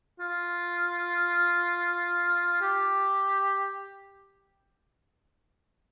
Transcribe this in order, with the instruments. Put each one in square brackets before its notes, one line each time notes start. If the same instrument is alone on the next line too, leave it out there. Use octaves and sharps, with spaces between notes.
[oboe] F4
G4